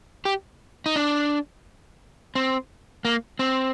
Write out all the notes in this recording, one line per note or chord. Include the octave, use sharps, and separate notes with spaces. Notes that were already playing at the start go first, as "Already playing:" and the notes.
G4
D#4
D4
C4
A#3
C4